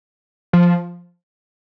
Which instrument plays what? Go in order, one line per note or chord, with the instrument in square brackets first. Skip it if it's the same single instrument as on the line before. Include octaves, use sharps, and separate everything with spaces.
[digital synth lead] F3